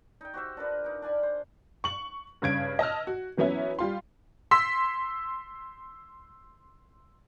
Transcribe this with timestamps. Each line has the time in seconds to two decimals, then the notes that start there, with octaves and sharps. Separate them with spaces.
0.21 D#4 G5
0.34 F#4 G4 C5 E5
0.57 D4 F4 A#4 B4
0.84 D#4 A#4
1.02 D4 D5 G#5 B5
1.23 C5
1.84 C#6 F#7
2.42 G2 C#3 G#6 D7
2.79 D#5 A5 E6 F6
3.07 F#4
3.37 E3 F#3 B3 C#4 E4
3.79 G3 F4 C6
4.51 C6 E6 B6